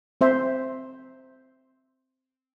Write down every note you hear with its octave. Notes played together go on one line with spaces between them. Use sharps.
C4 C5 E5